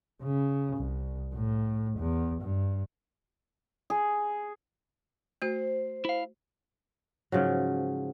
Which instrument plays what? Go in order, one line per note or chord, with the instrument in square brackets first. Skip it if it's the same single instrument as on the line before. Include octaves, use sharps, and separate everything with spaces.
[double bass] C#3
C2
A2
E2
G2
[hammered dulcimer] G#4
[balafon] A3 F#4 [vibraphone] C5
[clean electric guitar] E4 F5
[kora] G#2 C#3 F3 F#3